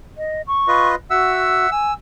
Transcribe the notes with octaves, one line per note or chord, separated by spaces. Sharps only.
D#5
C#6
F4 B4 D#5
F#4 E5 F#5 E6
G#5 E6